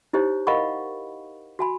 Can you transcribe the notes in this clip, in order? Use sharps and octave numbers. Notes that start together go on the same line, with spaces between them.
D#4 E4 G4 C5 C#5
A#4 D#5 F5 F#5 B5 C#6
F#4 G#5 B5